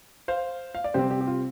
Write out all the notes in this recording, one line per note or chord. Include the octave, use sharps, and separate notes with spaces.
C5 F5
F5
D5
C3 G3 C4 G4 C5
G4
G4
F4